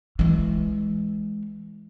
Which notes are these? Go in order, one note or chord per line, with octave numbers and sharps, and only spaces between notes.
E3 G#3